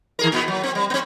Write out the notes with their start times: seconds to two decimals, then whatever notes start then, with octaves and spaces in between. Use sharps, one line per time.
0.19 D#3 G#4 A#4
0.32 A#2 B3
0.48 F#3
0.63 C4
0.75 G3
0.90 B3 C4